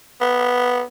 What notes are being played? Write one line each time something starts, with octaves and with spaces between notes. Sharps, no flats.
B3